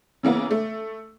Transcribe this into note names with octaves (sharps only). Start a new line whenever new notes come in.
C#3 E3 A#3 B3
A3